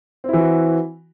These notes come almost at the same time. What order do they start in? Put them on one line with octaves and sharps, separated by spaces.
C4 E4 E3 F#4